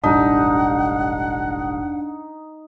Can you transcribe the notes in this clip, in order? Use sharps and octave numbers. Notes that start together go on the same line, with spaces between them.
E1 A1 G2 D4 D#4 F#5